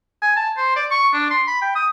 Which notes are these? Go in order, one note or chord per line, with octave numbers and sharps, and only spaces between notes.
G#5
A5
C5
D5
C#6
D4
C6
B5
G5
D#6